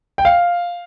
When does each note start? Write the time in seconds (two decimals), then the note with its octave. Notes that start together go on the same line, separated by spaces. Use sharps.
0.18 G5
0.25 F5